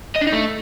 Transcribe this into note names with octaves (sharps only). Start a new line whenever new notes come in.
D#5
D4
D#4
A3